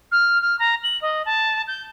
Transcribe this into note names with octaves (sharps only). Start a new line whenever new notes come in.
F6
F6
A#5
F#7
D#5
A5
G6